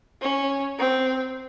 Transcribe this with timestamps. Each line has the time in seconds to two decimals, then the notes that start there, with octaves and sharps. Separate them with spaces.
0.22 C#4
0.79 C4